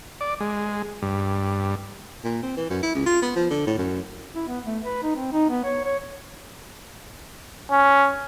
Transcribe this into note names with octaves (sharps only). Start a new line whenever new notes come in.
D5
G#3
G2
A#2
C4
E3
F#2
E4
C#2
F4
B3
F3
D3
A2
F#2
E4
B3
A3
B4
D#4
C4
D#4
B3
C#5
C#5
C#4